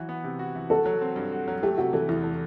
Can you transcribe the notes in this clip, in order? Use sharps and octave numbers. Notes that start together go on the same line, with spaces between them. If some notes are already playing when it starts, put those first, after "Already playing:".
Already playing: E3 F#3 F#4
B3
C3
F#4
E3
F#4 A4
F#3
C4
G2
F#4
F#3
A3 G4
C3 F#4
E3 A4
E2 E4
A3